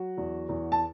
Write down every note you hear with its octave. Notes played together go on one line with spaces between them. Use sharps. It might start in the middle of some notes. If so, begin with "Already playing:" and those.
Already playing: F#3 F#4
E2
E2
A5